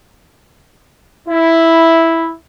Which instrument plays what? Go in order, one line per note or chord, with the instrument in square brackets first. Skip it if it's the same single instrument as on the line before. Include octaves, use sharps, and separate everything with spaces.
[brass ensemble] E4